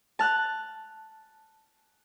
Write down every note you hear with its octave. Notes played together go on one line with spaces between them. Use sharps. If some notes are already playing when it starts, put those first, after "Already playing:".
A5 F6 F#6